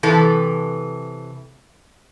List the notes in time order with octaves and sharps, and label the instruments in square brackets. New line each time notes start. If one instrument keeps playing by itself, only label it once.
[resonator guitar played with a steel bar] C3 E3 A4